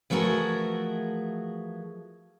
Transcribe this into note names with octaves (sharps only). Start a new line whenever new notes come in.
E3 F3 A3 F#4 G#4 A#4